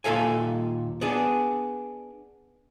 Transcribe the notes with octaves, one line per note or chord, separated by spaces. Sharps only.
D#2 A#2 A4 F5 G#5
B3 D4 G#4